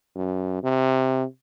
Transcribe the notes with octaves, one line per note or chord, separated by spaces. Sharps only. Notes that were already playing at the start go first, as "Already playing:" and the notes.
F#2
C3